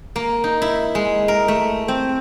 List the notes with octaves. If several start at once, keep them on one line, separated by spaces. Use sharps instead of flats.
A#3
D#4
E4
G#3
A#4
A3
C4